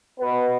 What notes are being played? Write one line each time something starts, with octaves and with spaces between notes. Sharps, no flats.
B2 B3 B4